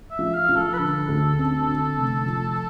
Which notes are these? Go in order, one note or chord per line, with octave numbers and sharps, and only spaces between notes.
E5
F3
F5
F3
A4
B4
D3 A4
D2
C4
D3
F1
F3